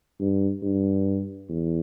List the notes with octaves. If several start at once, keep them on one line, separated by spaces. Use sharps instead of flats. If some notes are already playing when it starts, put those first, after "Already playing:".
G2
G2
E2